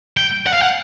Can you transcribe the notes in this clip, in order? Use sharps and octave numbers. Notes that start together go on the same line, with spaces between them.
G5
F#5
F5
F#5